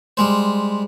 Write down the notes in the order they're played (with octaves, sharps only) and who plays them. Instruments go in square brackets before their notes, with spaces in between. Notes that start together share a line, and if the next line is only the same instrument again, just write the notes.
[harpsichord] G3 G#3 C5